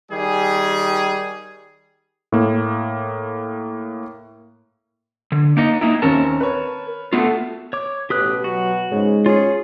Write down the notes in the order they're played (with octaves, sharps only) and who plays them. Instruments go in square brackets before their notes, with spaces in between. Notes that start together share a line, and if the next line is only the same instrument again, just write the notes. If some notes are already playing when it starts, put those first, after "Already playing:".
[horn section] D#3 G3 G#4
[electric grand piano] A2 A#3
[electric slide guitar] D3
[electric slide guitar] A#3 D#4 D#5 [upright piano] C#7
[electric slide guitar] A#3 D#4 E4 [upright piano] A#5
[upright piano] D#2 C4 C#4 [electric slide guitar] A#4 A5
[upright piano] B4 C#5
[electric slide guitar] A3 B3 F4 [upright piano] F#4 A4
[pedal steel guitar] C#5 D6
[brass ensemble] A1 B4 [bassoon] B2 [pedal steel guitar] G4 D#6 F#6
[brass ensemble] F#3 [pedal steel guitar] F#4
[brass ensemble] G#2 G#3 [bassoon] C#3
[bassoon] C#4 [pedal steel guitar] F4 G#4